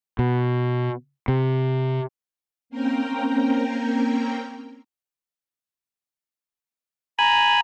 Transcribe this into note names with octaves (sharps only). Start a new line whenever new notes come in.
B2
C3
A#3 C4 C#4 A#4 G5 A#5
G#5 A#5 B5